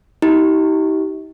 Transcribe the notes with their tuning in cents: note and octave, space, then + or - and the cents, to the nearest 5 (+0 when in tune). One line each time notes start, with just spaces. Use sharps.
D#4 +45 G4 -20